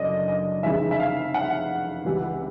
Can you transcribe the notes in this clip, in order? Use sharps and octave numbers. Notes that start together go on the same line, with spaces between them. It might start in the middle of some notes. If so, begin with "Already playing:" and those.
Already playing: F#1 F#2 D3 D5 D#5
D#5
F1 F2 C#3 E3 G#3 E5
E5
F5
F#5
C#2 C3 E3 G3